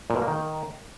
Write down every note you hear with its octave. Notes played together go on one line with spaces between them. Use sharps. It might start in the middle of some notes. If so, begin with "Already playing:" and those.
A#2
B2
A#3
D#3